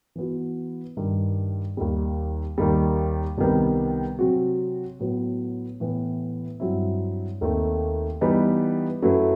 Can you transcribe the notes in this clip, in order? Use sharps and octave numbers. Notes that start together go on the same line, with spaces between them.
E3 B3 F#4
G2 D#3 G3
D#2 D#3 G3
D#2 D#3 G3
C2 C3 D#3 G3 B3
C3 F#3 C4 F#4
A2 F#3 B3
A2 E3 B3 E4
G2 F#3 C4 E4
D#2 D#3 A3 C4
E3 G3 B3 D#4
F#2 F#3 A3 E4 B4